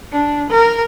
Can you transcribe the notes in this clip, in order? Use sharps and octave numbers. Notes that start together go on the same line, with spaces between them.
D4
A#4